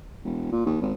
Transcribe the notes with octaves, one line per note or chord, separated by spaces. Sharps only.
E1
A#2
D#2
G#1